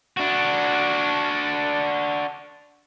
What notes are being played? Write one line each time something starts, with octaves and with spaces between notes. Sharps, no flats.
D4 F#4